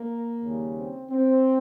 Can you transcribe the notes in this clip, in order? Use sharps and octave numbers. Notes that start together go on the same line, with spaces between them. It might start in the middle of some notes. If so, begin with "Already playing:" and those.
Already playing: A#3
D#2 C#3 G3
C4
C4